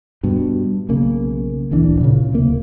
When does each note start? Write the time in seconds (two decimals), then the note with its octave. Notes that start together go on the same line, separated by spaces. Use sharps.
0.23 G2 B2
0.89 B1 C#3 A#3
1.71 D1 A#1 E3 D4
2.00 A#2 C#3
2.32 D1 C3 A#3